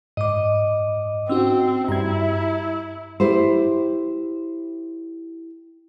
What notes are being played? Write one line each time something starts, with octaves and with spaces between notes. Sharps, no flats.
G#2 D#5 D6
C4 C#4 D#4 F#4 E6
G2 E4 A#5 G#6
E4 G4 C5